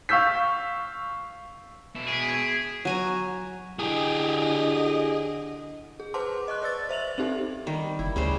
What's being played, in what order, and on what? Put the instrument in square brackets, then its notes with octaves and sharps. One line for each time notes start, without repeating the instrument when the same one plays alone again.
[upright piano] F5 C#6 E6 G6 B6
[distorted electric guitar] B2 E4 [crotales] E7
[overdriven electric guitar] G#4 [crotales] B6 D7
[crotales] G#6 D7
[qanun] F#3 G#5 A#5
[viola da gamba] D3 D#5 [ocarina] E4 [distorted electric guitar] G4 G#4
[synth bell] G#4
B4 C5 F#5 A5 C6 D6
D#5 C#6 F#6
B4 D5 E6 A6
C5 E5 F7 F#7
C4 D#4 G4 A4
[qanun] D#3 G3
[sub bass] F#1 [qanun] E4
[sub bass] D2 [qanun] C#3 G3 C5